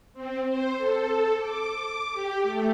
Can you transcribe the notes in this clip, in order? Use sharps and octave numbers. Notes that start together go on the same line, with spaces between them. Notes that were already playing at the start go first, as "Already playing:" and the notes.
C4
C5
A4
D6
G4
A3